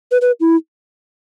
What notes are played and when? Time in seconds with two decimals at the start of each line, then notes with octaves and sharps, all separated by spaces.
0.11 B4
0.21 B4
0.40 E4